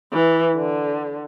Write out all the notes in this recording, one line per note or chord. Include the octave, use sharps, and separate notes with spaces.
E3
D3